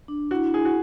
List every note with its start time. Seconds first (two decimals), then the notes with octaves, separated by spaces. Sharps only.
0.08 D4
0.31 E4 F#4
0.54 E4 G#4
0.65 F#4